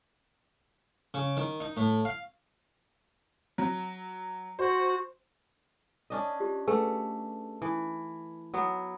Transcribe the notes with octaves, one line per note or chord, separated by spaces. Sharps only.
C#3
D#3
D#4
A2
F5
F#3
F#4 C5
C#4 D4 D#5
F4 G4
A3 G#4 B4 F#5 G#5
E3
F#3 B3